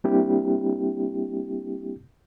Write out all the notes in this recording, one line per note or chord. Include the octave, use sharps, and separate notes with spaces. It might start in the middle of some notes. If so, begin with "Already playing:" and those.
G3 A#3 C4 D4 E4 G4